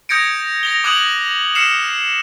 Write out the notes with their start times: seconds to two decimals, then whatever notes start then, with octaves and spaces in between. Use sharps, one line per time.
0.09 D#6 G6 G#6 A#6 C#7 D7
0.63 A#6 F7 G7
0.84 D6 D#6 F#6 G#6 D7 F#7
1.55 F6 C7 C#7 E7